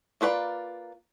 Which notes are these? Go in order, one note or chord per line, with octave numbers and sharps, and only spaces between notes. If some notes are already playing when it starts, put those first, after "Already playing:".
A#3 F4 B4 D5